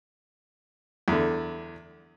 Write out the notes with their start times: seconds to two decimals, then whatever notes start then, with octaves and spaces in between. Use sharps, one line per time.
1.08 E2 D3